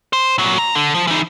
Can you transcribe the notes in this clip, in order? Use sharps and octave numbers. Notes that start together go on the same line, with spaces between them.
C5
A#2 F#3
A#5
D3
F3
E3 D#4